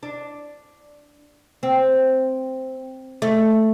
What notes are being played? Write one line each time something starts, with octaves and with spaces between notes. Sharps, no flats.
D4
C4
A3